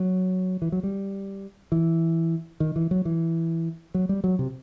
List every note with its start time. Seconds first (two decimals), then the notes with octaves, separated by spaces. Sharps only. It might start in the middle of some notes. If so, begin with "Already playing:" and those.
Already playing: F#3
0.62 E3
0.72 F#3
0.83 G3
1.72 E3
2.60 D#3
2.76 E3
2.91 F#3
3.05 E3
3.94 F#3
4.09 G3
4.24 F#3
4.39 C3